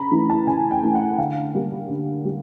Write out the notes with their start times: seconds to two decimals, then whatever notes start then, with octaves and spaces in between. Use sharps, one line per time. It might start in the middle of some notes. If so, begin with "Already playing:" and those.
Already playing: C#3 A#5 B5
0.12 E3 A3
0.30 A5
0.47 C#3 G#5
0.71 G5
0.83 E3 A3
0.95 F#5
1.18 D3 F5
1.54 G3 A#3
1.89 D3
2.25 G3